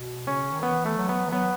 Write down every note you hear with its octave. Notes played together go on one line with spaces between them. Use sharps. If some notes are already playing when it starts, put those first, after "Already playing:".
Already playing: B2
C#3 C#4
D#3
E3 B3
A3
F#3
B3
E3
F#3 B3